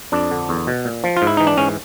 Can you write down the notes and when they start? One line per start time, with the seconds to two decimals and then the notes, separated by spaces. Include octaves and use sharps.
0.12 F2 D4
0.31 D3
0.49 E2
0.67 B2
0.85 A#2
1.04 F3
1.17 F4
1.22 G#2
1.27 E4
1.37 E3 D#4
1.47 D4
1.58 G#2 C#4